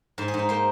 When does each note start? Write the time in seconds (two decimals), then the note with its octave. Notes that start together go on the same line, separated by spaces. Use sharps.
0.18 G#2 C5
0.28 G#4
0.34 G#2
0.39 D#4
0.49 A#3 C5